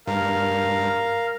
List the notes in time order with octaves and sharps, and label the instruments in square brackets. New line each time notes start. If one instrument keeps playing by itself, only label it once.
[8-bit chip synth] G2 [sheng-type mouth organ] A#4 F5